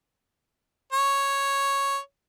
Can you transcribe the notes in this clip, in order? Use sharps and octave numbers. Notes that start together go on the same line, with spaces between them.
C#5